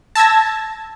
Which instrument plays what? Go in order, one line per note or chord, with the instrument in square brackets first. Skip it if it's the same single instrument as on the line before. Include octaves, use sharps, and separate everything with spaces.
[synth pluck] A5 E6 G#6 A#6